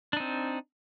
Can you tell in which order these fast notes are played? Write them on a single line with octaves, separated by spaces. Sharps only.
D4 D#4 C4